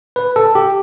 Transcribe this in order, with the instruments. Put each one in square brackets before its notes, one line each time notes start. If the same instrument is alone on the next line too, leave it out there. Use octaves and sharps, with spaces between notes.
[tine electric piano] B4
A4
G4